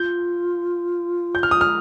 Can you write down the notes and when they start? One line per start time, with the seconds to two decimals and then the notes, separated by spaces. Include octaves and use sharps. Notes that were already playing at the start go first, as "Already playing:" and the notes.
Already playing: F4 G6
1.35 G6
1.43 F6
1.51 D#6
1.61 F6